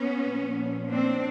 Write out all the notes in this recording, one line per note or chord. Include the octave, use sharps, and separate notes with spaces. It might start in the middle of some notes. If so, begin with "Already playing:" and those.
Already playing: B3 C#4
A#2 F3
C4 D4